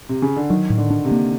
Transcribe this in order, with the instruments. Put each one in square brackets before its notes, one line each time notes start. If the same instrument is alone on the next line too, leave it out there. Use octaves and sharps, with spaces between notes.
[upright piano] C3
C#3
D3
[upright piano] D#3 [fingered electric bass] F#3
[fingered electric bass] A2
[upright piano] D3
[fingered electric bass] D4
[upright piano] C3
[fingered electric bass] A#3